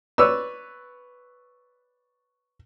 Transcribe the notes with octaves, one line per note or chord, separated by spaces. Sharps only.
B4 C#5 D5 E6